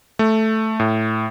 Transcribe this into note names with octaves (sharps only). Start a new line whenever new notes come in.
A3
A2